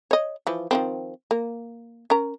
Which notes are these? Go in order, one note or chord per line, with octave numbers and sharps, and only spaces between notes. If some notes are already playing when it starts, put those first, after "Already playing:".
C#5 D#5
E3 F3
D#3 F3 C4
A#3
C#4 A#4 A#5